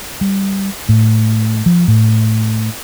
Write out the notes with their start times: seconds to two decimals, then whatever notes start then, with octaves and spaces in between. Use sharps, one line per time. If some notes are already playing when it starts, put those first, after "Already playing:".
0.21 G3
0.89 A2
1.66 F3
1.88 A2